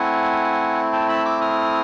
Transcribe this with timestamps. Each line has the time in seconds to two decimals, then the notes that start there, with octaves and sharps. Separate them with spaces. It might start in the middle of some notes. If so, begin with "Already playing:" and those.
Already playing: A3 C4 E4 F#5 G#5
0.93 G5 A5
1.09 A5 B5
1.25 D6 E6
1.41 D#6 F6